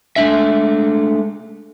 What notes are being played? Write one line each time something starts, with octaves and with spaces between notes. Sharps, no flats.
G#3 A3 D4 E5